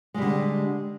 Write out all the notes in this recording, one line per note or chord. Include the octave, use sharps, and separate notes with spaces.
D3 G3 G#3